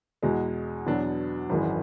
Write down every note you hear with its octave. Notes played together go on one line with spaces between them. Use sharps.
E2 B2 G#3
E2 B2 F#3 B3 D4
G#1 F#2 E3 G#3